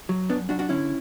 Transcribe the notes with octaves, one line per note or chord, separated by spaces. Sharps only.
F#3
F#2 B3 D4
F#2 D4 F#4
D4 F#4
D3 C#4 E4